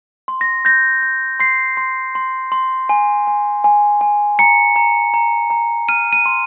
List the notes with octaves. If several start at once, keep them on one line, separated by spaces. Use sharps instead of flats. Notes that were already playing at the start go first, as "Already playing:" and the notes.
C6
A#6
G6 A#6
G6
C6 C7
C6
C6
C6
G#5
G#5
G#5
G#5
A#5 C#7
A#5
A#5
A#5
F6 D#7
D#7
C6